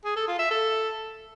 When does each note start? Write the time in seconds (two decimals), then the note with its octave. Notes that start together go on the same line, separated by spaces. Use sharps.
0.05 G#4
0.16 A4
0.28 F4
0.39 E5
0.51 A4